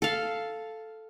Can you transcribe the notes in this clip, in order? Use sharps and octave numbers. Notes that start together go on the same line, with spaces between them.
A4 F5